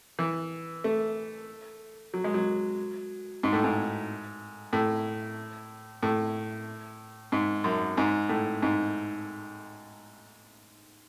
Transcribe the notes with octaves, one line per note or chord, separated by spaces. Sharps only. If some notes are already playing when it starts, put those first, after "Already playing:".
E3
A3
F#3
G#3
F#3
G#2
A2
G#2
A2
A2
G#2
F#2
G#2
A2
G#2